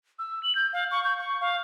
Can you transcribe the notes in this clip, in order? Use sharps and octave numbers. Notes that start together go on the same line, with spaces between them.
E6
F#7
G6
F5
C#6
G6
C#6
F5